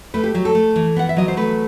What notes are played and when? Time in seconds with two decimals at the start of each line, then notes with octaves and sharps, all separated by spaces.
0.14 A3 B4
0.24 G4
0.34 F#3 G4
0.45 A4
0.55 A3
0.76 E3
0.96 B3 F#5
1.09 E5
1.16 F#3 D#5
1.28 C5
1.37 A3 B4